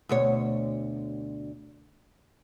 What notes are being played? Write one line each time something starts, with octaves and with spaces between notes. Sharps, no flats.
D2 B2 C#5